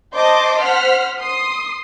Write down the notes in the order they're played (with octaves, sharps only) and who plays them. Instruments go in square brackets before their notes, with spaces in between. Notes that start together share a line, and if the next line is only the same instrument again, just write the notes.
[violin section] C5 D#5 A5 C6 D6 G6
C5 F#5 F6 B6
C6 D#6 C7